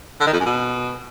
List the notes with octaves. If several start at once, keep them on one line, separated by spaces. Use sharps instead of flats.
D3
D#3
F2
F#2
B2